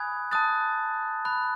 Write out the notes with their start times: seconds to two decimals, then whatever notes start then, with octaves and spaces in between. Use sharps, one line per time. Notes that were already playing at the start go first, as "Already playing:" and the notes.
Already playing: G#5 B5 D#6 F#6 G#6
0.31 A5 D#6 F#6 A6
1.25 B5 F#6